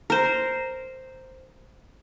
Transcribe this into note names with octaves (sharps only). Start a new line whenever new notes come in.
A#4 C5